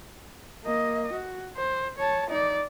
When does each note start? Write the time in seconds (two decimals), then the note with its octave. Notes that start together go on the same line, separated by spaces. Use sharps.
0.64 A#3 D#5
1.13 F#4
1.57 C5
1.98 C#5 A5
2.30 D#4 D5